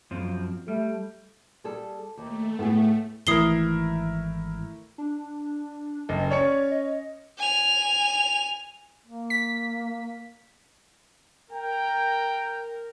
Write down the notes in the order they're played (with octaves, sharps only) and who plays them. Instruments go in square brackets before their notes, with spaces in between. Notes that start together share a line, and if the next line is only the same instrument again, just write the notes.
[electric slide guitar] F#2 F3 C4
[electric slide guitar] G3 [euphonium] A3
[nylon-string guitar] G3 G#4 A4
[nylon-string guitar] D#2 [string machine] A3
[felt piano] A2 [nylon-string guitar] B3 G#4
[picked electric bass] G#1 E3 [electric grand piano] A3 E4 A#4 [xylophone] D#6 C7 G7
[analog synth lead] D4
[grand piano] F#1 [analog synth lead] D#5
[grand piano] C#4 C#5 C#7 [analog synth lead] D5
[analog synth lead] D#5
[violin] G#5 F7
[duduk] A#3
[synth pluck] B6
[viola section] A#4 [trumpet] G5